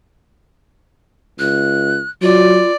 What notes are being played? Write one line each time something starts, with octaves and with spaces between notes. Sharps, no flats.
C#2 F#6
F#3 F4 D5